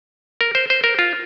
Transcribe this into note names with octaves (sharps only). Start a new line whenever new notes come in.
A#4
C5
C5
A#4
F4